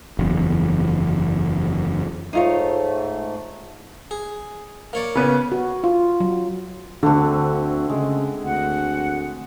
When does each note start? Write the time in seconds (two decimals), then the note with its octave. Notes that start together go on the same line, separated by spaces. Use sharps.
0.19 F#1 E2
2.33 G#2 A3 D#4 F4 C#5
4.11 G#4
4.93 A#3 C#5 D5
5.15 C#3 B3 C#4
5.52 F#4
5.84 F4
6.20 F#3
7.03 D2 D3 A3 C4 F#4
7.89 C#3 G#3
8.45 D2 F#5